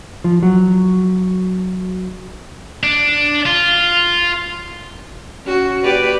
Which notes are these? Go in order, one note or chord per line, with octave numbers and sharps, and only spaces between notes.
F3
F#3
D4
F4
C#4 F#4
G4 B4 D5